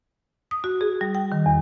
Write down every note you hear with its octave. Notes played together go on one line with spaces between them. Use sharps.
D#6
F#4
G#4
G3
G5
D#3
E2